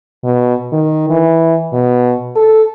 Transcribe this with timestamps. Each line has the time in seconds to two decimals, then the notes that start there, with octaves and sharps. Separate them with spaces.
0.24 B2
0.72 D#3
1.10 E3
1.73 B2
2.36 A4